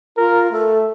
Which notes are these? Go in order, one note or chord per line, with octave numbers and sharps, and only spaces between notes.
F4 A#4
A3 A4